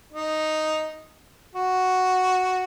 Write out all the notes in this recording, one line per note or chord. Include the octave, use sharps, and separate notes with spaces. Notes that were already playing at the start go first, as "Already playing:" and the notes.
D#4
F#4